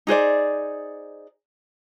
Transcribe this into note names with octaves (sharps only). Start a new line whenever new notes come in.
D#4 G#4 C5 D5